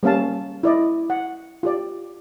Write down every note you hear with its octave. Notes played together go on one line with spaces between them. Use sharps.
G3 A#3 C#4 F5 A5
E4 D5 D#5
F#5
F4 G4 D5